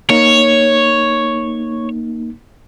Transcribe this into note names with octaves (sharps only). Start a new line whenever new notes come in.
A#3 D#4 C#5